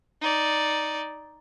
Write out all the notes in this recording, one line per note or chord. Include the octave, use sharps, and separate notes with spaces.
D#4 D5